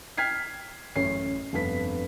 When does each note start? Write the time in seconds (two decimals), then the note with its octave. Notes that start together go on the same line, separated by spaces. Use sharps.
0.18 G5 F6 G#6 B6 C7
0.96 A1 F#2 C#4 C7
1.53 F1 G2 B3 B6